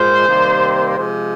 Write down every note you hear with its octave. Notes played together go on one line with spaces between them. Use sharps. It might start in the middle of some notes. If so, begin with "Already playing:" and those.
Already playing: A#2 G#3 C5
C3 D#3 G3 A#3
C3 F3 G#3